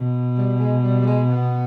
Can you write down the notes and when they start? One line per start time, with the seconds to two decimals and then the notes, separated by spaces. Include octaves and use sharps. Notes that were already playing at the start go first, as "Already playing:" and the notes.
Already playing: B2
0.37 G3
0.59 G#3
0.83 G3
1.01 G3
1.06 G#3
1.29 B3